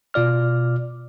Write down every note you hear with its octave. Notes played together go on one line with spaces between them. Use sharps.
B2 F4 D5 F6